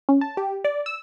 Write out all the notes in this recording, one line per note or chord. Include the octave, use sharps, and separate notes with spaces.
C#4
A5
G4
D5
E6